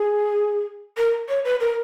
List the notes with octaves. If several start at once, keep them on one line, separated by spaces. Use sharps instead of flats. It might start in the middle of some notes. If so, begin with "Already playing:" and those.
Already playing: G#4
A#4
C#5
B4
A#4